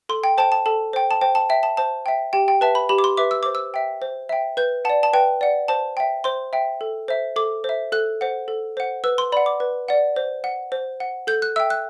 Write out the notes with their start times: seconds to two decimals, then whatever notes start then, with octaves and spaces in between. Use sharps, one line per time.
0.09 A4 C6
0.24 G5
0.38 C5 G5 A5
0.52 A5
0.66 A4 A5
0.93 C5 G5
1.11 A5
1.21 C5 G5
1.35 A5
1.50 E5 G5
1.63 A5
1.77 C5 A5
2.06 E5 G5
2.33 G4 G5
2.48 G5
2.61 B4 E5 A5
2.75 B5
2.89 G4 B5
2.98 D6
3.04 C6
3.17 B4 E5 D6
3.31 E6
3.43 C5 D6
3.55 E6
3.74 E5 G5
4.02 C5
4.29 E5 G5
4.57 B4 G6
4.85 F#5 A5
4.89 D5
5.03 A5
5.13 B4 G5
5.41 D5 F#5
5.68 C5 A5
5.97 E5 G5
6.24 C5 C6
6.53 E5 G5
6.81 A4
7.08 C5 E5
7.36 A4 D6
7.64 C5 E5
7.92 A4 F#6
8.21 C5 F#5
8.48 A4
8.77 C5 F#5
9.04 B4 E6
9.18 C6
9.32 D5 B5
9.37 F#5
9.46 D6
9.60 B4
9.88 D5 F#5
10.16 C5
10.44 F#5
10.72 C5
11.00 F#5
11.27 A4 G6
11.42 F#6
11.56 E5 G5 E6
11.70 F#6